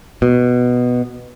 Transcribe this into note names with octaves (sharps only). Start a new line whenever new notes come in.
B2